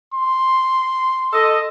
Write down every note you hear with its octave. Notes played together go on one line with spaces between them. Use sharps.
C6
A4 D#5